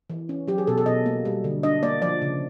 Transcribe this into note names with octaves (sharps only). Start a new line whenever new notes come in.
E3
C#4
F#3 G4
G#4
B2 A4
A4
B2 D#5
A#3
G3
D3
D4 D#5
A#3 D5
F3 D5
C#3